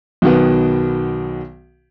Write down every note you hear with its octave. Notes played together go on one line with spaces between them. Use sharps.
B1 B2 D#3 B3